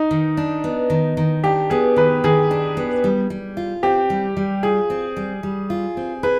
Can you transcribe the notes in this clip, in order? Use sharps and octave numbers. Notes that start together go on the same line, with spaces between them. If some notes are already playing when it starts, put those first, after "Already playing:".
Already playing: D#4
D#3
D4
B3
D#3
D#3
D4 G4
B3 G#4
D#3 B4
D#3 G#4
D4
B3
G3
G3
F4
C4 G4
G3
G3
F4 G#4
C4
G3
G3
F4
C4
G#4 B4